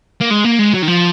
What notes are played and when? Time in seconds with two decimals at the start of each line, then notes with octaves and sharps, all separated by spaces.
0.21 A#3
0.31 G#3
0.45 A#3
0.59 G#3
0.73 F#3
0.82 D#3
0.88 F3